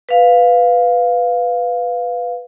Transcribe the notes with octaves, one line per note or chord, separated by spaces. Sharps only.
B4 F5